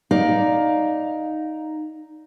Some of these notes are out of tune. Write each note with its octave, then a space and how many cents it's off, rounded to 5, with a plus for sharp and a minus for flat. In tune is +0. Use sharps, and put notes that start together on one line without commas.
D#4 +0 D5 +0 F5 +20